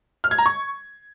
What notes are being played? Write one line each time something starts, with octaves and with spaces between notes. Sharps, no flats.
F6
G#6
A#5
C#6